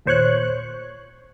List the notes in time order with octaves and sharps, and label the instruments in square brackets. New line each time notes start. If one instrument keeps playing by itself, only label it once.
[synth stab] D#2 A#2 C5 C#5 C#6 F#6